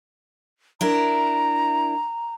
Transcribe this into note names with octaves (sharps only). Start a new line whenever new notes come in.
D4 E4 A#4 A#5